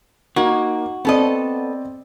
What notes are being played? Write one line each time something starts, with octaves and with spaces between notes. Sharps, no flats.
A#3 D#4 F#4
B3 C4 A4 D5 D#5